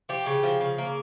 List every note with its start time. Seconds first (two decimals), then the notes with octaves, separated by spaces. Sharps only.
0.09 F3 G4
0.26 C#3
0.43 F3
0.61 C#3
0.78 A#3